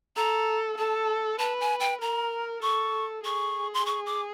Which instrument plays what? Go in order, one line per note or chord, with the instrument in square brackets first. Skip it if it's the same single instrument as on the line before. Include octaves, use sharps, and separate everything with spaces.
[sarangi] A4 [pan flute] A#5
[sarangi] A4 [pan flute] A5
[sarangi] B4 [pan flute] A5
[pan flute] G#5
G5
[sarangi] A#4 [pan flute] A#5
[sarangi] A4 [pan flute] C#6
[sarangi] G#4 [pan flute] C#6
[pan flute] C6
C#6
D6